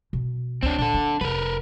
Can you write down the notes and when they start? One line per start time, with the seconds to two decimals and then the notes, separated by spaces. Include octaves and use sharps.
0.13 B2
0.63 A1 D2 C4 D4
0.79 A#2 D4 A4
0.94 A#3
1.21 F1 A#4 B4